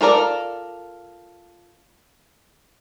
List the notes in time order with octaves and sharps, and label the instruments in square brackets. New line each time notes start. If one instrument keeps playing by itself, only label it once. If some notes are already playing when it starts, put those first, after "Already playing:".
[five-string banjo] F4 A4 A#4 D5